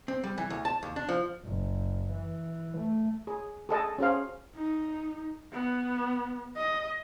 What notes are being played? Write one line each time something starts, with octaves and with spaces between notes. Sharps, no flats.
C4
G3
E3
D2
A5
D#2
D4
F3
F#1
E3
A3
G#4
G#4 A4 D#5 A5
C#4 F#4 G#4 C5 F5
D#4
B3
D#5